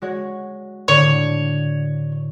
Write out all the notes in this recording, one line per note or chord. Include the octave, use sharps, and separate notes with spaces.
G#3 F#4 C#5
A2 D3 C#5